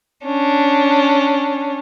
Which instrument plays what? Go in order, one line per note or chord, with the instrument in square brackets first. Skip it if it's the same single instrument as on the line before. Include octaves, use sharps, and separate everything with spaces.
[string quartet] C#4 D4